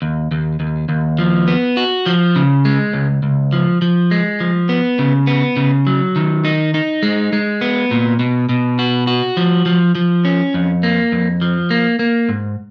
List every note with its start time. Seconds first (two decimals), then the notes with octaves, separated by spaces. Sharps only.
0.02 D#2
0.31 D#2
0.60 D#2
0.89 D#2
1.18 F3
1.48 B3
1.77 F#4
2.06 F3
2.36 C#3
2.65 G#3
2.93 C#2
3.23 C#2
3.53 F3
3.82 F3
4.11 G#3
4.40 F3
4.69 B3
4.99 C#3
5.27 B3
5.57 C#3
5.87 F#3
6.16 D#3
6.45 D#4
6.74 D#4
7.03 G#3
7.33 G#3
7.61 B3
7.91 A#2
8.19 B2
8.49 B2
8.79 F#4
9.07 F#4
9.37 F3
9.66 F3
9.95 F3
10.25 C#4
10.54 F2
10.83 A#3
11.12 F2
11.42 F3
11.71 A#3
11.99 A#3
12.29 G#2